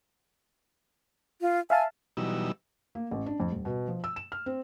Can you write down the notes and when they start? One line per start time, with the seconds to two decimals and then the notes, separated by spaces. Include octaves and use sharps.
1.41 F4
1.70 E5 F5 G#5 A5
2.17 B2 E3 F#3 G3 D#4 E6
2.95 A#3
3.11 A1
3.26 D4
3.40 F2
3.52 D#1
3.65 B2
3.88 F3
4.04 E6
4.16 E7
4.32 F6
4.46 C4